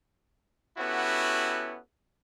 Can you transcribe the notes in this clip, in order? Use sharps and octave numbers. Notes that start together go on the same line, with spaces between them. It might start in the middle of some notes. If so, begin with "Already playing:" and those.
B3 C#4 E4 F#4 G4 A4